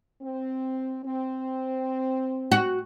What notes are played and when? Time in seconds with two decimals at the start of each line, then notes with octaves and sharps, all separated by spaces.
0.22 C4
1.04 C4
2.52 F#4